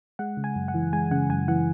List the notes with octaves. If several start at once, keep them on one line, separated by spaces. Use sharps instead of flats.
G#3 F#5
C#3
G#5
F#2
F#5
E3
G#3 G#5
C#3 F#5
F#2 G#5
E3 F#5